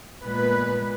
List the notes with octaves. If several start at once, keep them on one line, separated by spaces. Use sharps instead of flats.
A#2 G#3 B3 B4